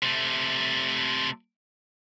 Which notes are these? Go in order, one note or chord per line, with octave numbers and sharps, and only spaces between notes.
C3 A3